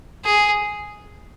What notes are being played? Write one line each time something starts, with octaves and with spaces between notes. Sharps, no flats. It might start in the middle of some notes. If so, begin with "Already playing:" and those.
G#4